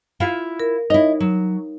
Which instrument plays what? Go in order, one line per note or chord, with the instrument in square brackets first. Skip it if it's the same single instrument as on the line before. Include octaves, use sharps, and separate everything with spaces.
[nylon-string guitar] E4 F4 F5
[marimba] A#4
[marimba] D#4 C#5 [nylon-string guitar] E4 D#5
[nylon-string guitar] F#3